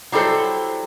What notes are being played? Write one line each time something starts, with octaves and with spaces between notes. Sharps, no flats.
F#3 G3 E4 A4 C5